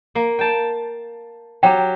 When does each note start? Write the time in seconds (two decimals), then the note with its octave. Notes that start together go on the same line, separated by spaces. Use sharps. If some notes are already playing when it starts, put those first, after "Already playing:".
0.15 A#3
0.39 G5 A5
1.63 F#3 G4 G5 A#5